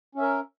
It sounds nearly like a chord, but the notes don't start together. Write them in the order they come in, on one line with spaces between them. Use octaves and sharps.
C#4 E5 A#4